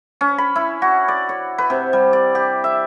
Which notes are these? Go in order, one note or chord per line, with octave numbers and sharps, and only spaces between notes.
C#4
B5
E4
F#4
D5
C#5
B4
C3
G3
D5
G4
E5